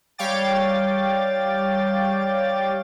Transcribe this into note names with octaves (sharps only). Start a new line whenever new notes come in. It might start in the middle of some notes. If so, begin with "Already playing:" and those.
G3 C#5 F5 G5 D6 A6